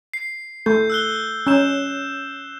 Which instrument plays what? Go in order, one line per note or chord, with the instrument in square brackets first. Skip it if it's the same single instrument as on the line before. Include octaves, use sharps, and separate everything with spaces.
[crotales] C7
[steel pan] A3 A4 [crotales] G6
[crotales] E6 F#6 G7
[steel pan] C#4 [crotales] E6 G6 E7